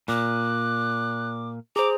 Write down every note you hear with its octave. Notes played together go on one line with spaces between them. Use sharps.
A#2 D6 F#6
G#4 C5 A#5 D6